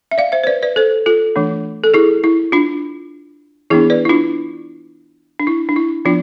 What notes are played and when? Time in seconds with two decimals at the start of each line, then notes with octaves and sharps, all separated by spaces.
0.11 E5
0.18 D5 F5
0.32 C5 E5
0.44 C5
0.47 B4 D5
0.62 B4 D5
0.76 A4 C5
1.06 F4 A4
1.36 E3 A3 D4
1.84 A4
1.94 E4 G#4
2.24 E4
2.52 D4 F4
3.70 E3 B3 D4 E4 G#4
3.90 B4 D5
4.05 E4
4.09 D4 F4
5.40 D4
5.47 E4
5.69 D4
5.76 E4
6.05 F3 B3 D4 F4